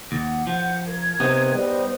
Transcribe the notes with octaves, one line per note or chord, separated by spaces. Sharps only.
D#2 F#5
F3 F#5 G6
A#4 G#6
C3 B3 D#4
G3 C5